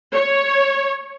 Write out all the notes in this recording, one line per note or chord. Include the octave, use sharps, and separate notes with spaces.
C#5